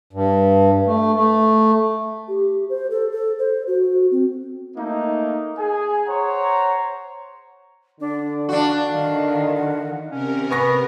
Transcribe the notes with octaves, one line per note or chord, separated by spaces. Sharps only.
G2
A3
A3
G4
C5
A4
A4
C5
F#4
C4
A3 A#3 D#4
G#4 G#5
C5 C#5 F#5 A#5
D3 D4
D4 F#4 F5
D3 D#3 F5
F#5
C3 C#4 A#4
B3 B4 G#5 C#6 A#6